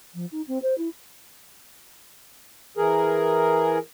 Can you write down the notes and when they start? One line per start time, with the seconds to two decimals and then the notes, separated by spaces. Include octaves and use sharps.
0.14 F3
0.32 D#4
0.48 C4
0.62 C5
0.78 E4
2.77 E3 G#4 A#4